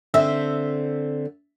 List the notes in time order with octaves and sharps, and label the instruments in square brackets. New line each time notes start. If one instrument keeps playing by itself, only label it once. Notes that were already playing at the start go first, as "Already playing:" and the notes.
[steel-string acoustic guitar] D3 C4 C5 [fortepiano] E5